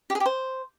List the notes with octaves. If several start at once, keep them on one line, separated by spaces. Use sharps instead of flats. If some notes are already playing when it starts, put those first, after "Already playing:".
G4
G#4
G4
C5